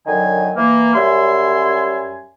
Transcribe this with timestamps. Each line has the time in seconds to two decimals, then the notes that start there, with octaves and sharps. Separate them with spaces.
0.07 F#2 D3 D#3 F#3 G#5
0.56 E3 A#3
0.95 F#2 G3 C#4 E5 G#5 C6